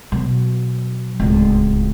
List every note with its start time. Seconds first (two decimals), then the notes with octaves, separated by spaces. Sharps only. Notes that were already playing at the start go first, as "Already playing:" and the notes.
0.12 B2 F#3
1.20 D1 C#2